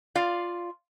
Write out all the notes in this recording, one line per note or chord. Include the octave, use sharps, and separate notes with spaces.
F4 D5 F5